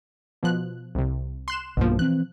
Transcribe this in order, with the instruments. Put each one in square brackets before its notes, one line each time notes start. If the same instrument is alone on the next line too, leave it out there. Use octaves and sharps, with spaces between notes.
[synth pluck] B2 F3 F#6
C2 C3
C6 F#6 E7
[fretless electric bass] B1 G2 A#3 [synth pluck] B2 F3
[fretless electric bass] E3 C4 [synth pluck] F#6